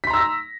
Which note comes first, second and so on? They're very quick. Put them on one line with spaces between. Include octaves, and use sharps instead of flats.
B6 C6 A#5 E6 A#6